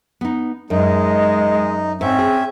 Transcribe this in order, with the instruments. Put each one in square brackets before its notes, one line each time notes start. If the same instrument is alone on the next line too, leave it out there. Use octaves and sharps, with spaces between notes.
[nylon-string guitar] B3 D#4
[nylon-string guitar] F#2 [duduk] G#3 [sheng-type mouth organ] D#4
[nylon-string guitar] G#2 [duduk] C4 [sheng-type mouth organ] C#4 E5
[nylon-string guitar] G#4